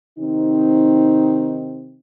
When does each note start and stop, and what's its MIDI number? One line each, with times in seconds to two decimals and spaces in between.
0.19 1.99 48
0.19 1.99 51
0.19 1.99 60
0.19 1.99 63